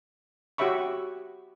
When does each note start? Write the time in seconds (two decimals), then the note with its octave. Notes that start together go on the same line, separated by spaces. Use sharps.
0.58 F#4 G4 C#5 E5 B5 C#6